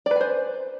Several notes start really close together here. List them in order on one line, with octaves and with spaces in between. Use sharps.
D5 B4 G#5 C5